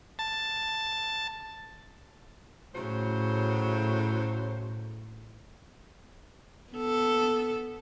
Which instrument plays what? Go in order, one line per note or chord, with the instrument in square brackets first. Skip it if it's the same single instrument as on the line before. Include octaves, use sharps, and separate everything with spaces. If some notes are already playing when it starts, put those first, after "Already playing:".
[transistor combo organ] A5
[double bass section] A2 [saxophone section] C#3 F#3 C5
[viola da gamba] B3 A4